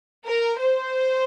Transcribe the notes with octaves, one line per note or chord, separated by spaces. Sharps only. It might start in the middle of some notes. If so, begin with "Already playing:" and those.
A#4
C5